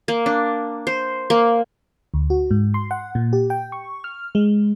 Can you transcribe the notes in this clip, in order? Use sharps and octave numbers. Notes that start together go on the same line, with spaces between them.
A#3
D4
C5
A#3
D2
F#4
G#2
C6
F#5
A#2
G4
G5
C#6
F6
G#3